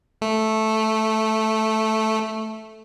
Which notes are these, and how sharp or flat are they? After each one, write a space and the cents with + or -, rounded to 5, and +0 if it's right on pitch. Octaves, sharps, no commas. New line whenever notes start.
A3 -5